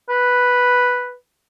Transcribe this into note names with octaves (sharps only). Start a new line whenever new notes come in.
B4